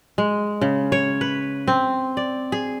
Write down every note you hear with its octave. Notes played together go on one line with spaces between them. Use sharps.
G#3
C#3
C#5
B4
C4
D5
G#4